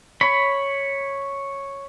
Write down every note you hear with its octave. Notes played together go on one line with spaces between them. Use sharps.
C#5 B5